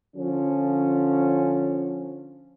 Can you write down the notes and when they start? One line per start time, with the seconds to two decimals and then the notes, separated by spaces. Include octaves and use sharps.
0.16 D3 F3 C#4